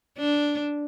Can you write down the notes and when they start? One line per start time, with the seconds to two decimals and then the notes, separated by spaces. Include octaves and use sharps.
0.18 D4